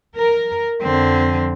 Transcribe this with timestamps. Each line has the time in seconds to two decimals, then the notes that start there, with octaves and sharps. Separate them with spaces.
0.16 A#4
0.82 F2 D3 C4